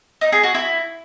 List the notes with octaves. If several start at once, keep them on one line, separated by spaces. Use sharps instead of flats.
D#4
G#4
F#4
E4